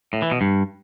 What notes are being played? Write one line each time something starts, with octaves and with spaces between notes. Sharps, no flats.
A2
E3
B2
G2